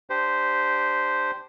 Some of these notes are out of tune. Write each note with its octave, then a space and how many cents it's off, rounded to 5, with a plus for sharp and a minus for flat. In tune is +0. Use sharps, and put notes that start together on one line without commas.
D4 +0 G4 +0 C5 -10